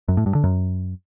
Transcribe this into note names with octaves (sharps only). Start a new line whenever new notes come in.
F#2
A2
G2
D3
F#2